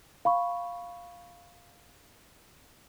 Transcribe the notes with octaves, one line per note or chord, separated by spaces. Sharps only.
F5 B5 C#6